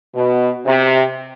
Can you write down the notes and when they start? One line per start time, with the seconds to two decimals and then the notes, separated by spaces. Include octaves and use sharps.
0.14 B2
0.65 C3